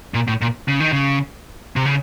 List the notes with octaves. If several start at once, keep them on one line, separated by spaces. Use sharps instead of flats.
A#2
A2
A#2
C#3
D#3
C#3
C3
C#3